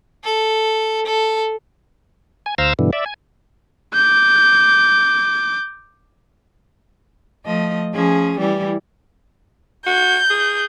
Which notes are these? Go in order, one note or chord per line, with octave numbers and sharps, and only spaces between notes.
A4
A4
G#5
D2 C5 F5 A#5 E6
G2 B2 D3 E3
D5 E5
G#5
D6 G6
F3 A3 D#5
F3 C#4 G#4
E3 G3 E4
F#4 G6
G#4